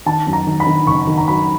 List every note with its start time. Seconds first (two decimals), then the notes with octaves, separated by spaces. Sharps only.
0.06 D#3 A5
0.27 F#2
0.33 A#5
0.47 D#3
0.60 B5
0.67 D#3
0.87 F#1 C#6
1.07 D#3
1.17 A#5
1.28 F#3 B5